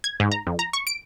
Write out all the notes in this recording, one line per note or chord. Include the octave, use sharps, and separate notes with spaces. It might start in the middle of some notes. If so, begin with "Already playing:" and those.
G#6
G#2
A#5
F2
A#5
C#6
D7